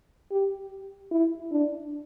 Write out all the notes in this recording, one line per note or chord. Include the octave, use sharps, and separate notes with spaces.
G4
E4
D4